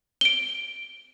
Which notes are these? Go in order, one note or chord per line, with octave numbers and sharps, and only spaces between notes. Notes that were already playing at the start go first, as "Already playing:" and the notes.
D7 G7